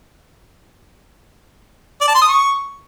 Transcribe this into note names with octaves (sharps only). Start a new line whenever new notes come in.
D5
A5
C6
D#6
C#6